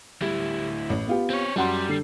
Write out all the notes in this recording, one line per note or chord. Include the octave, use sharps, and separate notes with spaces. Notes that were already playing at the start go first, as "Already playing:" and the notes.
D2 G3 E4
A1 A2
B3 F4 G4
C4 C#5
F#2 G3 F#5 C6
D3 C7